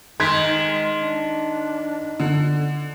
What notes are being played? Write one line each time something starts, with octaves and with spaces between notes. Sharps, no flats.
D#3 G#3 C6 G#6 B6
D4
D3